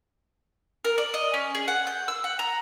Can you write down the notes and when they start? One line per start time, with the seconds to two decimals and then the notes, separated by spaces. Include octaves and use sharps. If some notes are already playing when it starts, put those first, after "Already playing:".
0.85 A#4
0.98 D5
1.14 D#5
1.34 C#4
1.55 G#4
1.68 F#5
1.87 G6
2.08 E6
2.24 F#5
2.39 A#5